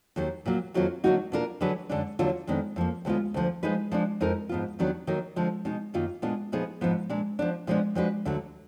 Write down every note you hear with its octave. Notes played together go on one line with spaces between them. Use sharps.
D#2 D#3 F#3 A#3
A#2 F#3 A#3
F2 D#3 F#3 A#3 F4
D3 F#3 A#3 D#4 F#4
B2 A#3 D4 F4 A#4
D3 F#3 D4 G#4 B4
F#2 D3 G#3 D4
D#2 D3 F#3 A#3 F4
F2 D#3 G#3 B3 D4
F2 F3 A#3
D2 D3 G#3 B3 F4
D2 D3 F3
F3 G#3 D#4 G#4 B4
F3 G#3 D4
F2 F3 G#3 D#4 A#4
G#2 F3 B3 F4
D#2 D#3 F#3 B3 D4
D#3 F#3 A#3 D#4 A#4
D3 F3 G#3
B2 G#3 D#4
F#2 D#3 A#3 F4
A#2 G#3 B3 D4 F4
A#2 F3 B3 D#4 G#4
G#2 F3 B3
A#2 G#3 D4
F3 B3 D4
A#2 F3 G#3 B3 D4
F3 G#3 D4 F#4 B4
D2 D3 F#3